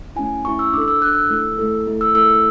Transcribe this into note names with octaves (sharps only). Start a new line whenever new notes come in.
A3 C#4 E4 G#5
A3 C#4 E4 C#6
E6
D4 A4 D6
E6
D4 A4 F#6
E6
A3 E4 A4
A3 E4 A4
A3 E4 A4
E6
A3 E4 A4 E6